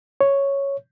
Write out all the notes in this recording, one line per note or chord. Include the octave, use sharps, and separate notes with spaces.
C#5